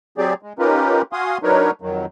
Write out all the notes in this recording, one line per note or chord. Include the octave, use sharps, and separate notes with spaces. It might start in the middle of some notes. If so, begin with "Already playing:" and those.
F#3 C4 G4 G#4 D5
G#3
C#4 D#4 F4 G4 A#4 B4
F#4 F5 G#5 C6 D#6
F#3 D4 D#4 A#4 B4 C#5
F2 D#3 F#3